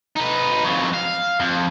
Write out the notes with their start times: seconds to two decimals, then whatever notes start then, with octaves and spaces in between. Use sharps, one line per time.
0.16 D#4 B4
0.65 F2 F#3
0.94 F5
1.40 F2